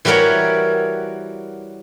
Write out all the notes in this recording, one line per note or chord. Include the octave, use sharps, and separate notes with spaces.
E3 G3 F#4 A#4 C#5 F#5